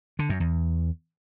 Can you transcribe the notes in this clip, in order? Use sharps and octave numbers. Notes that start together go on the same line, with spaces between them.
D3
F#2
E2